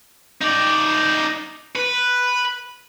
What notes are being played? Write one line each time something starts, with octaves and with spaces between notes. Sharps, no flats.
D#4 D5
B4